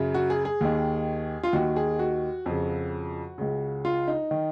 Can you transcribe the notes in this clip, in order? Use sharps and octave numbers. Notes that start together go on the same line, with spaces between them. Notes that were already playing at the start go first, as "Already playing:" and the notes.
Already playing: F#2 C#3
F#4
G#4
G#4
D#2 D#3
F4
D#2 D#3 F#4
G#4
F#4
F2 C#3
C#2 C#3
F4
D#4
D#3